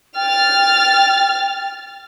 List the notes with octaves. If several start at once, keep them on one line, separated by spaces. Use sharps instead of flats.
G5 F6 A6